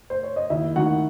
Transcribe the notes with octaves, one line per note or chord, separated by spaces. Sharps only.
C5
C#5
D#5
D#2 E4 E5
D#3 F#4 F#5